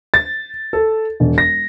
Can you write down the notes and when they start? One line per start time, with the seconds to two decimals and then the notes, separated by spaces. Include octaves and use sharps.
0.14 A6
0.73 A4
1.20 E1
1.38 A#6